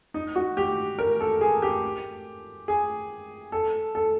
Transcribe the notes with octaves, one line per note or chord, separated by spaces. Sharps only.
D#4
F#4
G4
A#4
A4
G#4
G4
G#4
A4
A4